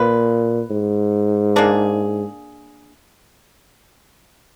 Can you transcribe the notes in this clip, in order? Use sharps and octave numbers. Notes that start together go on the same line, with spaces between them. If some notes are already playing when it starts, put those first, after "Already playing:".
Already playing: A#2 A#3 F4 B4
G#2
A#3 D4 G#4